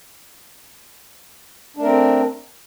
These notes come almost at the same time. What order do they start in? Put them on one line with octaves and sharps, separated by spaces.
D4 A3 A#4 C4